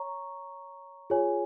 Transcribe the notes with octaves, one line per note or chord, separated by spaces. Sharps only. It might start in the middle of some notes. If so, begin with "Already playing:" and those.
Already playing: C#5 A#5 C#6
F4 G#4 C#5 G#5